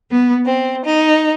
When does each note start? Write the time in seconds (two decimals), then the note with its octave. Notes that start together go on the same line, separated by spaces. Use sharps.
0.11 B3
0.45 C4
0.85 D#4